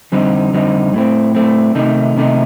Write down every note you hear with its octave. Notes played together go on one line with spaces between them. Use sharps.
F2 D3 G3 C4 D#4
F2 D3 G3 C4 D#4
A2 A3 C4
A2 A3 C4
C3 D#3 A3 D#4
C3 D#3 A3 D#4